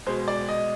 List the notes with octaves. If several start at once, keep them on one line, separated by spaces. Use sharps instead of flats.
B2 G#3 C5
D5
D#5